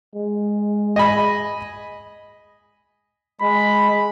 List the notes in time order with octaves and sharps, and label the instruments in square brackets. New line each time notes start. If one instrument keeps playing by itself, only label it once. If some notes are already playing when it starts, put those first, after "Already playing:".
[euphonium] G#3
[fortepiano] D#5 G#5 B5
[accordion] G#3 [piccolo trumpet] B5